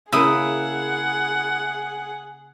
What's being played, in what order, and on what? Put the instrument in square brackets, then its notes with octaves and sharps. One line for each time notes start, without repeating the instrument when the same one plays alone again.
[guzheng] C#3 A#3 A#4 [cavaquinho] E4 D#6 [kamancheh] G#4 F#5